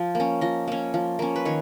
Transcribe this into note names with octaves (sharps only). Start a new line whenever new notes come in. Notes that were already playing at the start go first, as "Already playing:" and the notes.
Already playing: F3
A#3 C#4
F3 D#5
A#3 C#4
F3
A#3 C#4
B4
D#3 C#5